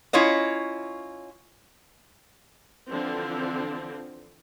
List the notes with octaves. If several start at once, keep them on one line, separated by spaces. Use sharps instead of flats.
C#4 E4 F4 C#5 D#5
D3 E3 F3 C4